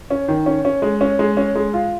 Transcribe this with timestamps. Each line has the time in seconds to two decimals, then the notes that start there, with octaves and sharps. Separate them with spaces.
0.10 C#4
0.28 D#3
0.46 C#4
0.65 C#4
0.82 G#3
1.01 C#4
1.19 G#3
1.37 C#4
1.55 G#3
1.74 F4